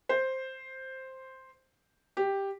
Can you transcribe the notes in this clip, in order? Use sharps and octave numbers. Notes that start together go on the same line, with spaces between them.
C5
G4